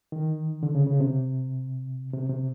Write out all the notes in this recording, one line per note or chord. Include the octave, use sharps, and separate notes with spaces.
D#3
D3
C#3
C#3
C3
C3
C3